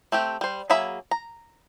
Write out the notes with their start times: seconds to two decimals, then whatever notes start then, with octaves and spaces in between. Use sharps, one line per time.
0.12 A3 C4 G4
0.41 G3 C5
0.70 F#3 A#3 G#4 E5 B5
1.11 A#5